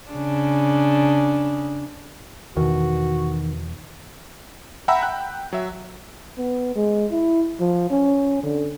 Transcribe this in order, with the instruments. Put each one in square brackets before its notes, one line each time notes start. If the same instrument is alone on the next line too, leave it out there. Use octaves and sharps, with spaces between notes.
[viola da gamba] C#3 D4
[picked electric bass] E2 B2 [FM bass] D#3 [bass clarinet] F#4
[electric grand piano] E5 F#5 G5 A#5 B5 E6
G5 F#6
F#3 E5
[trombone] B3
G#3
E4
F3
C#4
D3